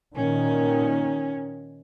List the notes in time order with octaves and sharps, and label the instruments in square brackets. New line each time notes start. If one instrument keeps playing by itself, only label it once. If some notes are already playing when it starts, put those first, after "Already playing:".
[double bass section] A#2 D#3 [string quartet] C#4